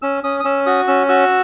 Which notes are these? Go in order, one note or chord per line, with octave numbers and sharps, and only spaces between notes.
C#4 E6
C#4 D#6
D#6
C#4 E6
F#4 D#6
C#4 E6
F#4 E6